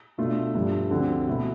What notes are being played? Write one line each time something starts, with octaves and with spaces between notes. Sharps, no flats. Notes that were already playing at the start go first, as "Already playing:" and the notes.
B2 A3 D4 F4
G2 F3 A3 D4 F4
D2 D3 F3 C4
B2 A3 E4